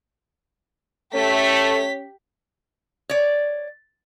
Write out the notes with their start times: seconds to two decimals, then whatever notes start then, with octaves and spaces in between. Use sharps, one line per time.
1.14 A3 C#4 G4 B6
3.09 C#5 D5